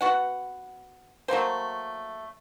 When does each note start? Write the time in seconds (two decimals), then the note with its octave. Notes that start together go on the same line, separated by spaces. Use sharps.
0.01 B3 F#4 F#5
1.28 F#3 A3 A#3 C5